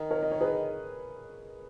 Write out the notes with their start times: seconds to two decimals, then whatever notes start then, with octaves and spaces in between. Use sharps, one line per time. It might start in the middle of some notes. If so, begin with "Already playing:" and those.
Already playing: D#3 D#5
0.11 A#4 C#5
0.23 D#5
0.31 C#5
0.41 G#4 B4